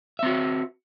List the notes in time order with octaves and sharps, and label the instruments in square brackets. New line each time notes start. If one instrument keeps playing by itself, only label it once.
[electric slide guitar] E5
C4
F#4